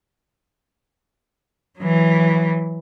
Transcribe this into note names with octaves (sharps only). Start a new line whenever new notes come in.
E3 F#3